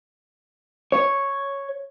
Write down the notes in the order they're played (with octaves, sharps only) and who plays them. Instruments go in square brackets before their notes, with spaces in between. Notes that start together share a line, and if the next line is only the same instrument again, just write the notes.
[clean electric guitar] C#5